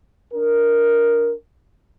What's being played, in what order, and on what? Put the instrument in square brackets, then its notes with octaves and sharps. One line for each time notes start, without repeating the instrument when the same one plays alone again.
[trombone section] D4 A#4